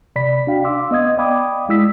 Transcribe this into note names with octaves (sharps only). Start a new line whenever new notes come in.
C3 D5 B5 B6
D4 F#4 F5 G5
F5 C6 D6 E6
B3 D#5 D#6 G#6
D5 F5 G5 B5 D6 D#6
G#3 E4 E6 B6